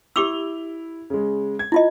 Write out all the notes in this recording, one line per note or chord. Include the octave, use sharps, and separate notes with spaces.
E4 G4 D6 E6 F7 G7
C#3 G#3
G#6
E4 F4 D#5